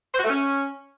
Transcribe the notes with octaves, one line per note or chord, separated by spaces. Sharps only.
C5
F#4
A3
C#4